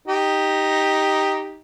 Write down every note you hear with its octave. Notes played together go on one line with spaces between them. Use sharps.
D#4 G4